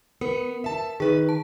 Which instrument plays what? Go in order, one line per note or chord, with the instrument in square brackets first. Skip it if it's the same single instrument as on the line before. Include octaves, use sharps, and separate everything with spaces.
[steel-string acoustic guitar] B3 [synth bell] A#4
[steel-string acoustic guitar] E5 A5
[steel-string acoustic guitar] D#3 B4 [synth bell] G#4
[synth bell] A5